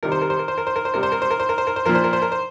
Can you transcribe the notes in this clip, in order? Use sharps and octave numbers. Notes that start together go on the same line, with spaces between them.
C3 D#3 G3 A#4
C5
A#4
C5
A#4
C5
A#4
C5
A#4
C5
C3 G3 A#4
C5
A#4
C5
A#4
C5
A#4
C5
A#4
C5
A#2 F3 A#4
C5
A#4
C5
A#4
C5